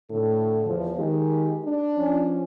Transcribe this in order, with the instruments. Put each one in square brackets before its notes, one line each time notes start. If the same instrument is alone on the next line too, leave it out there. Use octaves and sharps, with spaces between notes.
[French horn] A2 [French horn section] D3 A4
[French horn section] E2 F3
[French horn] D#3 [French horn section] G#3 G4
[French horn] D4
[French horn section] F3 C#4